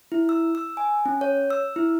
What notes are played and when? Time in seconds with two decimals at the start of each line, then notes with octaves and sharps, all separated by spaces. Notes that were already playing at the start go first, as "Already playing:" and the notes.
0.12 E4
0.29 E6
0.55 E6
0.77 G#5
1.06 C#4
1.21 C#5
1.50 E6
1.76 E4